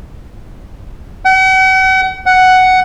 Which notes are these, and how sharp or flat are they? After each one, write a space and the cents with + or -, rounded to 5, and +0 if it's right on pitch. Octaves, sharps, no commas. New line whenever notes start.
F#5 +40
F#5 +5